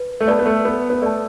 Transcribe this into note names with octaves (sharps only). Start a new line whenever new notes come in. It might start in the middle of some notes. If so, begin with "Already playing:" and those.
Already playing: B4
A3
B3 D5 A5
B3
A3
B3 B4
B3
A3 D5 A5